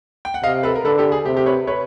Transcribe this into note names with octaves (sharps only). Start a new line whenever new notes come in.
G5
F#5
C3 D#5 F5
A4 B4
A#4
D3 A4 B4
G4 A4
G#4
C3 G4
G4
B4 C#5
B4 C#5